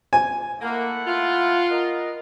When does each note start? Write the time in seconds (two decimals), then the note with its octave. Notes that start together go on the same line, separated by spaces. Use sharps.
0.13 G#5
0.61 A3 A#3 E4 F#5
1.06 F4
1.70 A#4 D#5